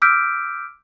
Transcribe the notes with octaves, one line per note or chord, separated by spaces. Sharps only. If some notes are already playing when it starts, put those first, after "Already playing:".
D6 E6 F6 G6 B6 D7